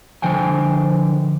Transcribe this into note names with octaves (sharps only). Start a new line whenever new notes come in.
D3 F3 C5 G5 G#5